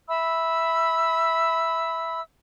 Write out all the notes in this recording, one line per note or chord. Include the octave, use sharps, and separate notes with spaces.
E5 B5 E6